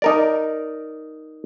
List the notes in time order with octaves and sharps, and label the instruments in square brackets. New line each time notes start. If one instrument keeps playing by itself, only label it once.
[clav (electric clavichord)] D#4 A#4 D5